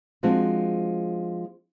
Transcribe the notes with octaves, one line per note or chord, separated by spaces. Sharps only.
F3 G#3 C4 D4 F4 F#4